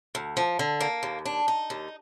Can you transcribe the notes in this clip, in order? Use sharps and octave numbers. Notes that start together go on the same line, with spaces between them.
D2
F3
D3
A#3
D#2
D4
D#4
D#2